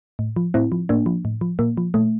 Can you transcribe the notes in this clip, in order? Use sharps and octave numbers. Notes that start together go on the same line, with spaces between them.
A2
F3
A2 C4 E4
F3
A2 A#3 D4
F3
A2
F3
A#2 A#3
F3
A#2 A3